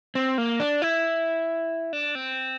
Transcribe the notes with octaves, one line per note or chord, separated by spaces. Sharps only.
C4
A#3
D4
E4
D4
C4